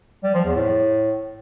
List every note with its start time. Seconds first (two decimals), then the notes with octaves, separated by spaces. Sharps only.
0.23 G3
0.34 F3
0.45 E2
0.56 A2